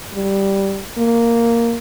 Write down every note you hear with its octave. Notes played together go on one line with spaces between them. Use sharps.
G3
A#3